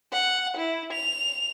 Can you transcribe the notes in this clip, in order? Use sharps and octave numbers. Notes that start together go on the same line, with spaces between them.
F#5
E4
F7